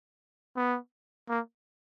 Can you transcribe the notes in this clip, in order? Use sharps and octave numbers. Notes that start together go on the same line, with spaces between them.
B3
A#3